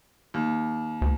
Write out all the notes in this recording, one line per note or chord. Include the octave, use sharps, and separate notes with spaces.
D#2
D2